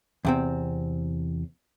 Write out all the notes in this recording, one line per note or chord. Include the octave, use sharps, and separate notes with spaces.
E2 C3 C4